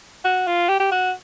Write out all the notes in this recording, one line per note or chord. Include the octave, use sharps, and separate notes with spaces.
F#4
F4
G4
G4
F#4